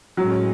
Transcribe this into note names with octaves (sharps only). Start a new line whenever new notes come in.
A2 F#3 G#3 C#4